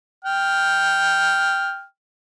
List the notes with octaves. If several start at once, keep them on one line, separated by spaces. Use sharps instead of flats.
G5 F6